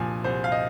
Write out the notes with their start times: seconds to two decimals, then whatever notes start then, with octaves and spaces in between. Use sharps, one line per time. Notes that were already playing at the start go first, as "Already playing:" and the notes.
Already playing: C2 A#2 F3 G#5
0.24 C2 C5
0.44 F5
0.52 D#5